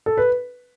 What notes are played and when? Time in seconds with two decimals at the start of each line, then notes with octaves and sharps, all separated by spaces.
0.06 A4
0.17 B4